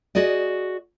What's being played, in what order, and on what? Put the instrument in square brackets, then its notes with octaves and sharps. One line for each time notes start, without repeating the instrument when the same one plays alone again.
[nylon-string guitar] F#4 G#4 D5 D#5